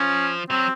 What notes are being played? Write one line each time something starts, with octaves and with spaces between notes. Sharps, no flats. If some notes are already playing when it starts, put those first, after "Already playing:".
Already playing: F3 C#4
F#3 C4